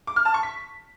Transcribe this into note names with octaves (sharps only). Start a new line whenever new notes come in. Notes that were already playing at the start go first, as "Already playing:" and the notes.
D6
F6
A5
C#6
B6